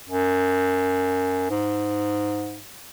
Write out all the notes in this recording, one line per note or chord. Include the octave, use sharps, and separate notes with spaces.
F#2
G#2